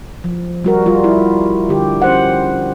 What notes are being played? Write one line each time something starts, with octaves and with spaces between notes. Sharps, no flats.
F3
G3 F#4 A#4
G3 F4
E4
D3 G4
C#4 C5 F#5